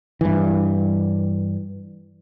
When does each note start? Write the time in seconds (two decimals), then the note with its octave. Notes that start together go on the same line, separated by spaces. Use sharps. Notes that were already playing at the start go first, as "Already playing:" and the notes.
0.21 G2 E3